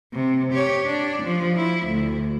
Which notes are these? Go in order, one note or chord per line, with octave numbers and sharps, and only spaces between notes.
C3
G4 C#5
D4
F3
E4
D2